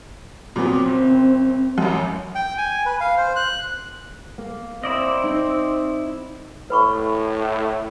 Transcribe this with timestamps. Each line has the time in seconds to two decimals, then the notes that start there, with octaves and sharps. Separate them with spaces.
0.56 A#2 F#3 B3 C4
0.86 F#1
1.78 A1 F#2
2.35 G5
2.58 G#5
2.86 B4
3.00 F5
3.17 C5
3.36 F#6
4.38 A#3
4.84 C4 E4 D5 D#5
5.24 D#4
6.70 A2 B4 B5 C#6